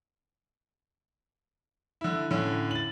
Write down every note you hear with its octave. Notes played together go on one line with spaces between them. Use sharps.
D3 E4
A2 D3 C#4
A6 F#7